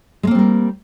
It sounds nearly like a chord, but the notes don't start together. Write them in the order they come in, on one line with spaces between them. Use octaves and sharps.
G#3 A#3 C4 G3 A#4